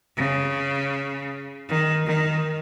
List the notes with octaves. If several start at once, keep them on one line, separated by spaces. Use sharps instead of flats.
C#3
D#3
D#3